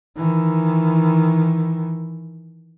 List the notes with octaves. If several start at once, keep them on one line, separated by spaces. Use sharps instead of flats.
D#3 E3